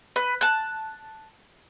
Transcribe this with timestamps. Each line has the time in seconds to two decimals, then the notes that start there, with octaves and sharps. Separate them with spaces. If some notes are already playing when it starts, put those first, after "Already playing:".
0.16 B4
0.41 A5 F#6